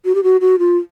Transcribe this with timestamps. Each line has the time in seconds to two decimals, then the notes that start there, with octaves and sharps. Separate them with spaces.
0.05 F#4
0.15 G4
0.23 F#4
0.41 F#4
0.59 F4